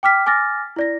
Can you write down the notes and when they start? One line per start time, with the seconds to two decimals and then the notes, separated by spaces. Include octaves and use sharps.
0.03 G5 D6 F6 B6
0.26 G#5 D6 F6 A6 A#6
0.76 E4 D5 A#6